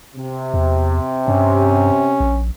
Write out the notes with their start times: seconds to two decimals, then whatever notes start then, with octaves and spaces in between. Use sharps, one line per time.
0.16 C3
0.54 E2
1.28 G2 C#4
2.20 A#1